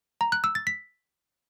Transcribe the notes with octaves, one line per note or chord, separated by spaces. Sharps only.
A#5
F#6
E6
A6
B6